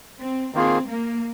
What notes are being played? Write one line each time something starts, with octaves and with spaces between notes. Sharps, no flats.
C4
D#3 A#3 C4 F4 G#4
A#3